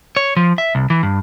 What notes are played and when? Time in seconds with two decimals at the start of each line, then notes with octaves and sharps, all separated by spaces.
0.17 C#5
0.37 F3
0.58 E5
0.75 C2
0.90 E3
1.03 G2